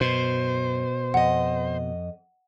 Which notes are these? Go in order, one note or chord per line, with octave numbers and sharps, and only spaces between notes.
F#2 B2 C5
F2 D#5 F#5